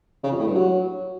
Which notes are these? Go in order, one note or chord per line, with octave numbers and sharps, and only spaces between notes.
C#3
F2
A2
G2
F#3